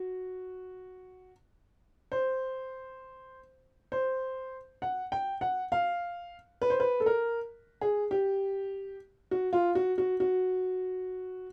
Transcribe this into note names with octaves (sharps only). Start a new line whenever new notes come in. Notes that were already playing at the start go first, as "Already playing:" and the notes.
Already playing: F#4
C5
C5
F#5
G5
F#5
F5
B4
C5
B4
A4
A#4
G#4
G4
F#4
F4
F#4
F#4
F#4